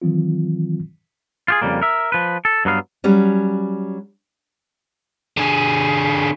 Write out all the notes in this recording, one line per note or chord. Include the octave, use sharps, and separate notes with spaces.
D#3 E3 F#3 C4 F4
F4 G4 G#4
F2 C#3 G3 A#3
A#4 E5
F3 B4
A4
G2 F#3 B3 F5
F#3 G3 C#4
D3 G#4